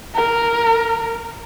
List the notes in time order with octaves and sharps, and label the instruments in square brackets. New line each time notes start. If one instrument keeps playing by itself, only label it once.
[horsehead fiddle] A#4